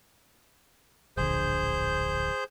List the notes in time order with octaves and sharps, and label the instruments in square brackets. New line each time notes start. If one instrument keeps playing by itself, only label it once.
[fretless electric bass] D1 A#1 D3 [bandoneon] G#4 C5 G6